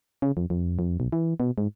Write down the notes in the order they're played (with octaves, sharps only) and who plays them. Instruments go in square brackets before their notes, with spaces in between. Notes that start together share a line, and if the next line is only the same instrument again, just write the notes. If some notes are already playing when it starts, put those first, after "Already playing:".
[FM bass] C#3
F2
F2
F2
B1
E3
B2
G#2